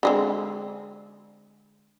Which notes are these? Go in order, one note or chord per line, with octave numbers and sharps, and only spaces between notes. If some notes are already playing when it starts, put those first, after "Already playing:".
D3 G#3 C4